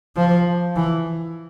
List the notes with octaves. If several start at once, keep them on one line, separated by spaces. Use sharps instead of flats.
F3
E3